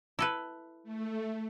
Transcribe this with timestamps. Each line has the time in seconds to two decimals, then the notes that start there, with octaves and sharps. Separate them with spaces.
0.19 E4 A4 B4
0.84 A3